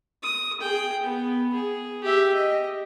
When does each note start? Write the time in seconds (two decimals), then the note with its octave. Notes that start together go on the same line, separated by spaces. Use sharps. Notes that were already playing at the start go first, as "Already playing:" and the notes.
0.23 D#6
0.60 G#4 G5
1.03 B3
1.53 G#4
2.04 G4 E5
2.34 D#5